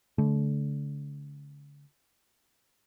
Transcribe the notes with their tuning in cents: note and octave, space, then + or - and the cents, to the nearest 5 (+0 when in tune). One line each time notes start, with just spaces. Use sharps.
D3 -35 A3 -35